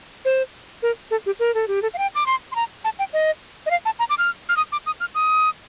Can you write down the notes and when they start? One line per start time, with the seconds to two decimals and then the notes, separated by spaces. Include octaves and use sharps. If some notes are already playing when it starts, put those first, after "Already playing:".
0.25 C5
0.82 A#4
1.11 A4
1.26 G4
1.40 A#4
1.55 A4
1.68 G4
1.82 A4
1.94 F5
1.98 G5
2.15 D6
2.26 C6
2.52 C6
2.55 A#5
2.84 A5
2.99 G5
3.13 D#5
3.66 D#5
3.71 F5
3.85 A5
3.99 A#5
4.10 D6
4.18 F6
4.49 F6
4.57 D#6
4.72 D6
4.86 D#6
5.00 F6
5.15 D#6